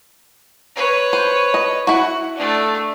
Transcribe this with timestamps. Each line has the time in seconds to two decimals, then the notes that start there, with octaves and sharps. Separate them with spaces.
0.75 B4 C#5
1.13 C5
1.54 D#5
1.87 E4 F#4 F#5
2.35 A3 D4